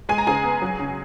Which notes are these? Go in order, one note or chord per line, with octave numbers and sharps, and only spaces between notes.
G#3 G#5
A#5
C#3 G#4 G#5
B3
F#3
C#3